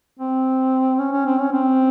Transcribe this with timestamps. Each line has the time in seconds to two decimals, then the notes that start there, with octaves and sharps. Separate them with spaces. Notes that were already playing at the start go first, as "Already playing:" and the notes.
0.19 C4
0.99 C#4
1.12 C#4
1.26 C4
1.40 C#4
1.52 C4